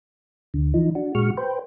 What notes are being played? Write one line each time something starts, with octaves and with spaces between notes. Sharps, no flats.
D2 D3
E3 F3 D#4
D4 F#4
A#2 G#3 F#4 C#6 F6
B4 C5 G5